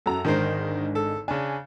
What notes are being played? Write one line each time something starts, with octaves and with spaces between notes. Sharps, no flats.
F#2 F#4 A4 A#5
G#1 D3 D#3 G#3 A#4 C5
A4
C#3 D4 G#5